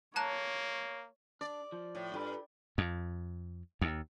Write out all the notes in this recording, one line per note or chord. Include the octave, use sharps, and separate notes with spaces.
A#3 C#5 A5 A#5 F#6
D4 D5
F3
A2
G2 F4 A4 B5
F2
D#2